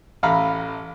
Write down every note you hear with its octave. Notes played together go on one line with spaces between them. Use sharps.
A1 A4 F5 A#5 B5